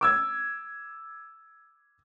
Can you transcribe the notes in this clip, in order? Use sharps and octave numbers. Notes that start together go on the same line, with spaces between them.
D6 E6 G#6